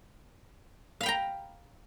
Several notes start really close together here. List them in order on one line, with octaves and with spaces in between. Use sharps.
F5 B5 G5 A#5